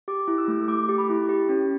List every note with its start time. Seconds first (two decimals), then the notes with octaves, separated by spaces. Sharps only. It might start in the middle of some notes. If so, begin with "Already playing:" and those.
0.08 G4 D6
0.28 E4
0.38 E6
0.48 A3
0.68 A3 D6
0.89 G4
0.98 B5
1.09 E4
1.29 G4
1.49 C#4